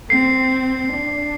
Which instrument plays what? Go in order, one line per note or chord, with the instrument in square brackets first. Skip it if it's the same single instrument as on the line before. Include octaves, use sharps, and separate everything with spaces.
[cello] C4 [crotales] C7
[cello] D4